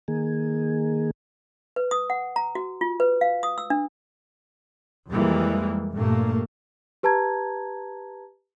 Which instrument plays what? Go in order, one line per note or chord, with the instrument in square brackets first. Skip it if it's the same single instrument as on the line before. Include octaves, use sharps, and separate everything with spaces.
[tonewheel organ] D#3 A#3 G#4
[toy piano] B4
D#6
F#5
A#5
F#4
F4
B4
F5
D#6
E6
D4
[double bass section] F2 E3 G3 G#3 A#3
G2 A#2 A3 A#3
[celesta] G4 B4 A5 A#5 G#6